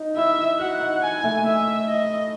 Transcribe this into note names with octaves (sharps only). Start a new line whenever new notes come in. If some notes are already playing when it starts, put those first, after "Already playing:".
Already playing: D#4
E4 E5
F#4 F#5
D#4
G#5
A3
E5
D#5